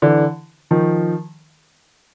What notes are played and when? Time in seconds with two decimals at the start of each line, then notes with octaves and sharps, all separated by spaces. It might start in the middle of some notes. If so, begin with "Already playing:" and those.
0.02 D3 E3
0.71 D#3 F3